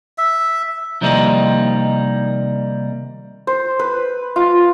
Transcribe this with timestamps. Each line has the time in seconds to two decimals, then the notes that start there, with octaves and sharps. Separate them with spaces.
0.18 E5
1.01 C3 D#3 F3 G3 A#3 D#4
3.47 C5
3.79 B4
4.36 F4